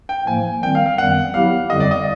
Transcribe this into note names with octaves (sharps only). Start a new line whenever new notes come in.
G5
A2 F3 A#3 G#5
D#3 G3 C4 G5
F5
F5
F#2 D#3 G3 B3 F#5
F#3 B3 E4 G4 F5
F2 D3 G3 D#5
D5
D#5